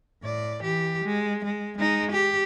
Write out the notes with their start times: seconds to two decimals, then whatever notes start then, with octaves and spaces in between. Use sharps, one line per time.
0.23 A2 D5
0.62 E3 G4
1.05 G#3
1.45 G#3
1.78 G#3 D#4
2.11 G4